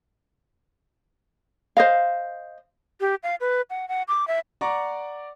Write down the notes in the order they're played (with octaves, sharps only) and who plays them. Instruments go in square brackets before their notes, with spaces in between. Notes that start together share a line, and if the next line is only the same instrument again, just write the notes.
[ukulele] C5 D#5 F5
[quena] G4
F5
B4
F#5
F#5
D6
E5
[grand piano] D5 F#5 A#5 C#6 D6